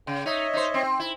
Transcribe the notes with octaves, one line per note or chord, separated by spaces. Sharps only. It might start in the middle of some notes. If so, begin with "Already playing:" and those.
C#3 G5
D#4 C#5 D#5 E5
D#4 C5
C4
E4